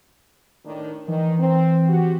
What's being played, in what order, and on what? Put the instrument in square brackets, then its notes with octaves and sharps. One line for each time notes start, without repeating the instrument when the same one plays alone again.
[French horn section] A2 D#3 D4
[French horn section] D#3 [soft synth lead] E3
[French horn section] C4
F#4 G4